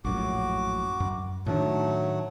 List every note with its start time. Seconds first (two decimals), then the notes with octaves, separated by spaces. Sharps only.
0.05 A#1 F#2 A2 F#4 D6
1.00 F#2
1.46 A2 D#3 F#3 A3 D4